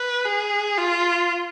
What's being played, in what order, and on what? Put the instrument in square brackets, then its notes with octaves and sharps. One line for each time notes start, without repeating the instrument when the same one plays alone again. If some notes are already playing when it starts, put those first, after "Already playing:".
Already playing: [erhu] B4
G#4
F4